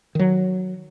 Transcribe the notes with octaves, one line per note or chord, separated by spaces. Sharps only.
D#3 F#3